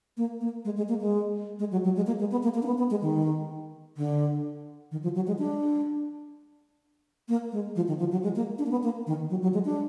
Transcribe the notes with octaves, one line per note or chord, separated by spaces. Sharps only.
A#3
A#3
G#3
G#3
A#3
G#3
G#3
F#3
F#3
G#3
A#3
G#3
B3
A#3
A#3
D4
B3
B3
G#3
D#3
D3
D#3
F3
F#3
G#3
D4
A#3
G#3
F3
D#3
F3
F#3
G#3
A#3
D4
A#3
B3
A#3
D#3
F#3
F#3
G#3
D4